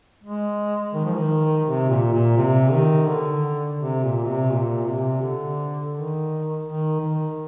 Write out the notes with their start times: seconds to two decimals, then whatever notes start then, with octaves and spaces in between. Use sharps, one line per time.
0.23 G#3
0.94 D#3
1.05 F3
1.16 D#3
1.66 C3
1.89 A#2
2.13 A#2
2.37 C3
2.73 D#3
3.08 D3
3.79 C3
4.03 A#2
4.27 C3
4.50 A#2
4.86 C3
5.22 D3
5.93 D#3
6.64 D#3
7.00 D#3